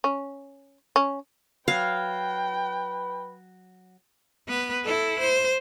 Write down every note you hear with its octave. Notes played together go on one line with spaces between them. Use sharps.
C#4
C#4
F#3 B4 F5 G5
B3 B4
E4 A4
C5